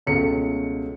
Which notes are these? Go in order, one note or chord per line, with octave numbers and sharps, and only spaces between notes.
C#2 B2 A3 C#4 C#7